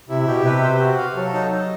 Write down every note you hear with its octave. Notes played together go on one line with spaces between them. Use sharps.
C3 E4
B2 G4
C3 B4
C5
F#4
F5
F#3 A4
D#4
D#4